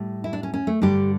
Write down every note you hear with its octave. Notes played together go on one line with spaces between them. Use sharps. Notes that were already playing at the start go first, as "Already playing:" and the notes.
Already playing: A2 G3
E4
D4
C#4
C#4
A3
G2 D3 G3 G4